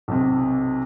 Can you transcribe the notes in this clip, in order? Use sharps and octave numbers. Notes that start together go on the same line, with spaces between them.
B1 C3